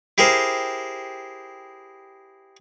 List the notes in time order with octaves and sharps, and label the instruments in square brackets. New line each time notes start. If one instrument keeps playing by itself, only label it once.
[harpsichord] E4 G4 G#4 A#4 C5